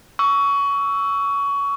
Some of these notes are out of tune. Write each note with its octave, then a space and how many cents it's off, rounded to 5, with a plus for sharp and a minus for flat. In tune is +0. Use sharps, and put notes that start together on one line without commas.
C#6 +20 E6 +0